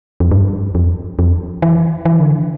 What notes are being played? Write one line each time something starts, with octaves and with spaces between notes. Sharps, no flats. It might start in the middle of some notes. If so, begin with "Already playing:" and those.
F2
G2
F2
F2
E3
E3
D3
E3